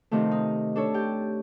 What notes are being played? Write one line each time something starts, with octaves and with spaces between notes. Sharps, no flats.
C3 D#3 F3 A3
D#4
D4 A4 C#5
G4 G5